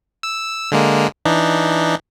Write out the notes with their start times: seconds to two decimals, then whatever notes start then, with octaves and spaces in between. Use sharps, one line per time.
0.23 E6
0.72 D3 G#3 A#3
1.25 E3 D4 D#4